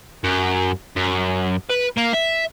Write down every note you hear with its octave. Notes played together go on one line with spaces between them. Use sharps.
F#2
F#2
B4
A#3
E5